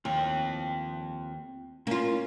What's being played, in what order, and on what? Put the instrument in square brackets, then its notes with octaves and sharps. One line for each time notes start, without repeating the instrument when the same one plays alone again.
[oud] D#2 [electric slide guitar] C4 F4 G5
[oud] A#3 F4 [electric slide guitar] C#4